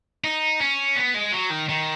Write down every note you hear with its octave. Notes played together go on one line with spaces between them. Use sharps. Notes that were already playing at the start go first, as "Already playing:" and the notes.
D#4
C#4
B3
G#3
F#3
D#3
D#3